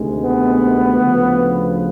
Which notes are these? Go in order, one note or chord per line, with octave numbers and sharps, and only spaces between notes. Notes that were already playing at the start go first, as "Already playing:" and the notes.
Already playing: D2 C3 D#3 G#3
B3
D2 C#3 F3